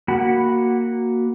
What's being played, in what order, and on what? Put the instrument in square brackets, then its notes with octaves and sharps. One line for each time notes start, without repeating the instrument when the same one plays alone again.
[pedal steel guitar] A#3 F#4 F#5 B5